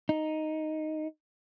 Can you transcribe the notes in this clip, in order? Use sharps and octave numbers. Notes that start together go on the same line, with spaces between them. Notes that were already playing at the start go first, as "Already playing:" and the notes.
D#4